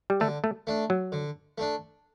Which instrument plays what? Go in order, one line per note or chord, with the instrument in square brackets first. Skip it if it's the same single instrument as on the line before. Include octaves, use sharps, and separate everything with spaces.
[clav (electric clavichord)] G3
[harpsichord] D3 [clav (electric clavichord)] A3
[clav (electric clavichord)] A3
[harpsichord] A3 D4
[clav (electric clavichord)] F#3
[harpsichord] D3
A3 D4